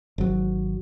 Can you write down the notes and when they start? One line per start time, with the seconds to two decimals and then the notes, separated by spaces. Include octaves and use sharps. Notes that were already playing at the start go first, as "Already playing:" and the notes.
0.18 G#1 F#3